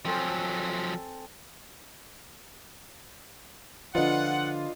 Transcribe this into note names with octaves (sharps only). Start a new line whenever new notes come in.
F3 F#3 C4 A4 G#5
D3 F3 D4 F4 B4 D#5 F#5